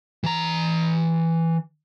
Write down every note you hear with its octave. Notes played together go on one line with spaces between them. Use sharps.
E3 A#5